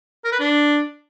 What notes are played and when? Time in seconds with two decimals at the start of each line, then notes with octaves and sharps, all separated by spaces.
0.25 A#4
0.32 B4
0.40 D4